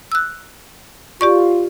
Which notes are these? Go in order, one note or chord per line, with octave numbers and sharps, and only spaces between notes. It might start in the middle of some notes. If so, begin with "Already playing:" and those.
E6 F#6
F4 G4 D5 C#6